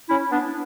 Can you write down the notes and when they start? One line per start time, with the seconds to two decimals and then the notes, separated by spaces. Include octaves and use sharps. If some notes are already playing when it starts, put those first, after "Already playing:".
0.09 C#4 E4
0.30 B3 D4